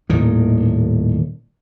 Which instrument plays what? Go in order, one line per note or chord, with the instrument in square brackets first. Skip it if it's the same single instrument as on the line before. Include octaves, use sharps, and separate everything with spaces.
[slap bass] D#1 A2 D#3